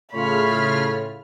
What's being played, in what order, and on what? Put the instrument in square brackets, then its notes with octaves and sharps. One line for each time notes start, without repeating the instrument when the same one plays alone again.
[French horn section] A2 A3 [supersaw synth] C#3 F4 F6 [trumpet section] C#5 [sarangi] B5